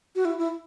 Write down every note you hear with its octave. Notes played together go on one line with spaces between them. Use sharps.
F#4
E4
E4